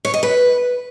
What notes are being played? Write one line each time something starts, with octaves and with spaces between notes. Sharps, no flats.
C#5
D#5
B4